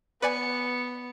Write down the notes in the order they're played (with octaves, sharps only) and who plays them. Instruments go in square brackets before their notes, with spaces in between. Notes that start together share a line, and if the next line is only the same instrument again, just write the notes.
[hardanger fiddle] B3 [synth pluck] B4 D5 G#5 [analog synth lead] C#7